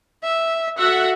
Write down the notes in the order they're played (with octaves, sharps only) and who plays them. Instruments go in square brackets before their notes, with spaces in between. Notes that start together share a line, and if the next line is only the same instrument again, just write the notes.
[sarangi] E5
[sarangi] F#4 [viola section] A4 E5 F#5